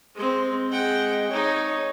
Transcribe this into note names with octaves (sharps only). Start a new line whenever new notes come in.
G#3 C4
G#3 F#5 G5
D#4 C#5